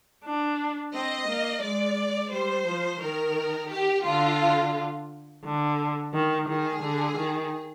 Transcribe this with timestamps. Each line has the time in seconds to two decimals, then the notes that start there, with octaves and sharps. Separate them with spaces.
0.24 D4
0.94 C4 D#5
1.29 A#3
1.63 G#3 D5
2.33 G3 C5
2.67 F3
3.02 D#3 A#4
3.71 G4
4.06 D3 F4
5.44 D3
6.14 D#3
6.48 D#3 G#4
6.83 D3
7.17 D#3